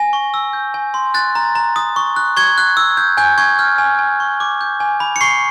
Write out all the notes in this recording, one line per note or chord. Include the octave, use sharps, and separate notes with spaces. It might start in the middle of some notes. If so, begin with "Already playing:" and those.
Already playing: G#5 A#6
C#6
E6
G6
G#5
C6
F#6 A6
A#5
A#5
D#6
C#6
F#6
C#6 G#6
F#6
E6
G6
G#5 G6
C#6 G#6
F6 G6
G#5
G#5
C#6
D6
G6
G#5
B5
C#7
C#6 C7